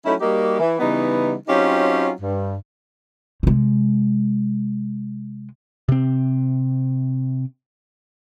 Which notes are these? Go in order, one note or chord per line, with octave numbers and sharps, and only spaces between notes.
F#3 A3 C#4 D#4 E4
G3 A#3 D#4 F#4 G4
E3
C#3 E3 G3 B3 D#4
F#3 C4 C#4 D#4 F4 G4
G2
C3 G#3
C3 C4